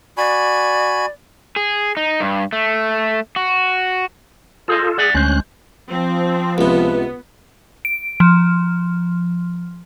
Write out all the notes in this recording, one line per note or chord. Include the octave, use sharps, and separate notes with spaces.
F#4 D5 G#5 B5
G#4
D#4
G2
A3
F#4
F4 G#4 A4 C5 D#5
G#4 D5 E5 F#5
D2 G#3 C#4 C5 F#6
F3 C4
C#2 C3 B3
D7
F3